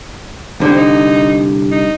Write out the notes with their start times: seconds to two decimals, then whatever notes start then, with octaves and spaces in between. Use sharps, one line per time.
0.60 C2 D3 C5
0.76 D#4
1.71 D#4